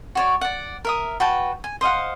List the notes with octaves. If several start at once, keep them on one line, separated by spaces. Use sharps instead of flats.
F#4 C#5 D5
D5 F#5
A#4 E5 D#6
F#4 B4 G5 A5
G#5
C5 D#5 F5 F#5